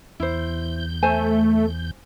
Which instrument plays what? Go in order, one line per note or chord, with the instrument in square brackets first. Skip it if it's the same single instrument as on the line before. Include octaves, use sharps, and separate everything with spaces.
[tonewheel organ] E2 G6 [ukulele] E4 C5
[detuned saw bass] A3 [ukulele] C5 G#5